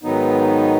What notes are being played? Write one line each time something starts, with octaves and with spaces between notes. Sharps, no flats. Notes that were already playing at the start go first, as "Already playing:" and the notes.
G#2 D#3 F#3 B3 D#4